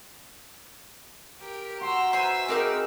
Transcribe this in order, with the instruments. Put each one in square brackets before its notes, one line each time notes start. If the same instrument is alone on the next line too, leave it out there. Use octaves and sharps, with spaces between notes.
[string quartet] G4 A#4
[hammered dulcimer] F#4 [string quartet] A#5 E6 [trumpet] C6
[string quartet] B4 E5 E6 [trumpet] C5 [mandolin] G#5 C6 [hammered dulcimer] A#5
[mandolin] C4 A#4 D6 [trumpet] D#4 [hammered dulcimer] G#4